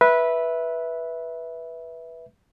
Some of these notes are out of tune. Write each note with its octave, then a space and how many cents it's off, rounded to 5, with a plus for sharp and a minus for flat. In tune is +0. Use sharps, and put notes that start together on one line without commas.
B4 -10 E5 -5